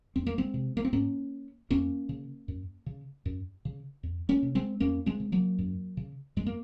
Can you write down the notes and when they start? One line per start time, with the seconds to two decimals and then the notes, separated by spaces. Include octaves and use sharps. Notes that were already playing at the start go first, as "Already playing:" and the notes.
0.16 F2 C4
0.27 A#3
0.38 G#3 C4
0.54 C3
0.77 A#3
0.85 C4
0.93 G#2 A#3 C#4
1.70 F2 A#3 C#4
2.09 C#3
2.48 F#2
2.86 C#3
3.26 F#2
3.65 C#3
4.03 F2
4.29 A#3 C#4
4.43 C3
4.55 G#3 C4
4.80 F2 A#3 C#4
5.06 G#3 C4
5.20 C#3
5.32 F#3 A#3
5.59 F#2
5.97 C#3
6.36 F#2 G#3
6.46 A#3